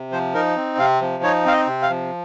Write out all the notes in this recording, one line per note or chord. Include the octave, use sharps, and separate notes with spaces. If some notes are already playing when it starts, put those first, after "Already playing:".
Already playing: C3
F3 C5
D#4 A#4
C4
C3 F5
F3
D#4 C#5
C4 F5
D#5
C3
F5
F3